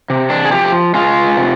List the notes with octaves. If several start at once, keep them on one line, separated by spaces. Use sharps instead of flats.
C3
D4
G#4
F3 G4
G#3 F4
C3